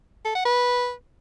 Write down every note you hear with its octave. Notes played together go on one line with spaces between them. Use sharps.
A4
F#5
B4